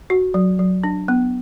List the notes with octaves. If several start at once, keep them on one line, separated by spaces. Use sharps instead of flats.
F#4
F#3
F#3
D4
B3